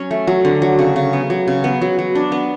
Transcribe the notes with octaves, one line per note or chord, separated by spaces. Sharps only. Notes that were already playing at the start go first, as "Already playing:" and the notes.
Already playing: F#3 C#4
A3
F#3
D3
F#3
C#3
C#3
B3
F#3
C#3
B3
F#3
F#3
D4
B3